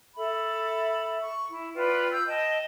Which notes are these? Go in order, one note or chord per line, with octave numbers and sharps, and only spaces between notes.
A4 E5 B5
C#6
E4
F4 B4 D5 G5
E6 G6
D#5 G5 A5